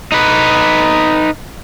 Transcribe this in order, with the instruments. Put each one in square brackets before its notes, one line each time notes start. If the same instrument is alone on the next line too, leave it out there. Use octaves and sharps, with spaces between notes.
[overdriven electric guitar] D#4 B4